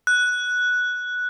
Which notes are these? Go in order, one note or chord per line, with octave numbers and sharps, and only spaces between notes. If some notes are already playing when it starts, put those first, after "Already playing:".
F#6